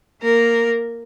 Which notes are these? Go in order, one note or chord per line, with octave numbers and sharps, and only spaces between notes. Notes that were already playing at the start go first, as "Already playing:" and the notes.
A#3 A#4